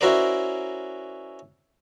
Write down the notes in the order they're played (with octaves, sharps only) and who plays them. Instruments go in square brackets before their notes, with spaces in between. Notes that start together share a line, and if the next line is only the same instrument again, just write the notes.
[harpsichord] C#4 E4 F#4 A#4 C5 D5